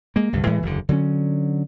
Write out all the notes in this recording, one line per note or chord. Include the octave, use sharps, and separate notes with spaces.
G#3 A#3
C2 G2 D3
A2 E3 G#3 A3
F#1 E2 D3
D3 F#3 A3 C#4